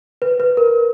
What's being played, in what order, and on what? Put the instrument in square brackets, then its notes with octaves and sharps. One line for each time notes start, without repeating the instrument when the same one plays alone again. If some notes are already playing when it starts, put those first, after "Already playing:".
[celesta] B4
B4
A#4